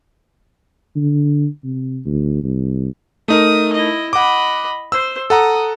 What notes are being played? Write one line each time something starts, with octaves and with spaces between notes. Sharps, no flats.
D3
C3
D2
C2
A3 D#4 A#4 D#6
E4 D#5
D#5 F#5 B5 D6
C5 E6
A4 F#5 A#5 D#6